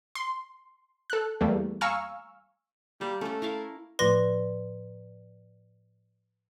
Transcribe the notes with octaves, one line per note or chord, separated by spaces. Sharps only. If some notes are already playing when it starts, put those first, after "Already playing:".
C6
A4 F#6
E2 G3 A3 A#3
F5 G#5 A#5 C#6 E6 F6
G3 A#3
A3 C#4 A4
E4 A#4 F5
A2 F3 B4 D5 C6 A#6